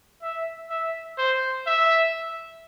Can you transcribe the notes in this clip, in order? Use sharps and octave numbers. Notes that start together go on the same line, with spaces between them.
E5
E5
C5
E5